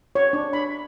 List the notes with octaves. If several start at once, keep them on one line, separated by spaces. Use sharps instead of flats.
C#5
D4
B5